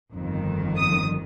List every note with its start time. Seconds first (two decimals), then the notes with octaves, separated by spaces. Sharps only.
0.13 G1 F2 D#3
0.78 D#6